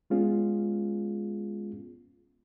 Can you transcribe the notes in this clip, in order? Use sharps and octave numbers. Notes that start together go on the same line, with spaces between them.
G#3 B3 C#4 F4 G#4